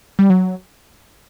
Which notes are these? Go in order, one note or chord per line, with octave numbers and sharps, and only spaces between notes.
G3
F#3